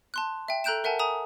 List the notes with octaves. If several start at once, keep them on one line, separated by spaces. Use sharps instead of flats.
A5 C6 F#6
E5 G5
A4 A#5 F#6 G6 D7 E7
A#4 E5 F#5 G#5 A5
G#5 A#5 D#6 E7